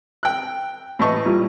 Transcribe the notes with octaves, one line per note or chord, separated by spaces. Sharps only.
G5 F#6
A2 E3 D#5 A5 C#6
A#2 G3 E4